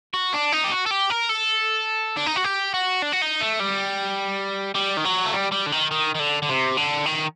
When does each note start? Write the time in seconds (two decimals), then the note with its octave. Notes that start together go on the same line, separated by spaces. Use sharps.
0.14 F#4
0.34 D4
0.52 D#4
0.64 G4
0.72 F#4
0.86 A4
0.91 G4
1.10 A#4
1.29 A4
2.17 D4
2.26 D#4
2.36 F#4
2.44 G4
2.74 F#4
3.02 D4
3.13 F#4
3.22 D#4
3.41 A3
3.60 G3
4.75 G3
4.97 D#3
5.05 F#3
5.25 A3
5.33 G3
5.52 G3
5.66 D3
5.72 D#3
5.91 D#3
6.15 D#3
6.20 D3
6.42 D3
6.49 C3
6.77 D3
7.06 D#3